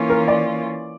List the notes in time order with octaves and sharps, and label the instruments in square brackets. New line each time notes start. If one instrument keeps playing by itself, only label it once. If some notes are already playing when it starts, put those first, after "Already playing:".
Already playing: [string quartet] E3 A#3 C#4 F4
[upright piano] A#4
D5